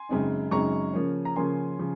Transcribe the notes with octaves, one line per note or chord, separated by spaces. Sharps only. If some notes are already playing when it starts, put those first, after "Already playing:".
Already playing: G#5 C6
F#2 C#3 G#3 C4 D#4
F#2 C#3 G#3 C4 D#4 A#5 C#6
C#3 F3 A#3 C#4
A#5
C#3 F3 A#3 C#4 G#5 C6
C#3 F3